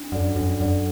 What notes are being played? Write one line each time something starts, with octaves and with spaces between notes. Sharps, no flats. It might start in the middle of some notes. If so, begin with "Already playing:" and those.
Already playing: D4
F#2 A4 D5 F#5
F#2 D4
F#2 A4 D5 F#5